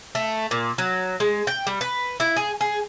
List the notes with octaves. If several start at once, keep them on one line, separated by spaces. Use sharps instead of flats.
A3
A#2
F#3
G#3
G5
G3
B4
E4
G#4
G#4